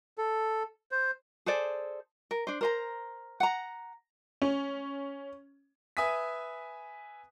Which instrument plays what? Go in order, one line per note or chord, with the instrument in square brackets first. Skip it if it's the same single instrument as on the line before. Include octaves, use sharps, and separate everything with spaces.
[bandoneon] A4
C5
[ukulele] G#4 A4 C5 D5
A#4
D4 C5
A#4 C5 A#5
F#5 A#5
[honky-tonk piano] C#4
[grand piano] B4 E5 G#5 D#6 B6